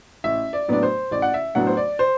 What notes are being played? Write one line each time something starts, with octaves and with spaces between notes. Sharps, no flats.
A1 E5
D5
A2 F#3 B3 D4 D5
C5
A1 D5
F#5
E5
A2 F#3 B3 D4 F#5
C5
D5
C5